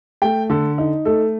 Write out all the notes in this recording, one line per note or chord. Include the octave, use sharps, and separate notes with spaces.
A3 G5
D3 A4
D#4
A3 A4